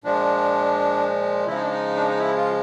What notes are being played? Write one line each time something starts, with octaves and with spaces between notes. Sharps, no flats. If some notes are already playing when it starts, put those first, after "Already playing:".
A#2 F3 G#3 D4
C#3 F3 G#3 E4
D#4
D4
D#4
D4
D#4
E4
F4